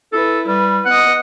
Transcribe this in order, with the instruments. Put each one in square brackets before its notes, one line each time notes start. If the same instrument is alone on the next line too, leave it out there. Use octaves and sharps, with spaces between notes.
[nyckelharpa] E4 B4 [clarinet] A4
[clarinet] G3 [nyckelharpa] B4
[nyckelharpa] B3 D#5 [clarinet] F#5